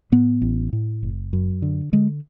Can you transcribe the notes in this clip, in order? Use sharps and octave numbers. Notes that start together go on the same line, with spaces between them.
A2 B3
A1
A2
F#1
F#2
D3
D3 G#3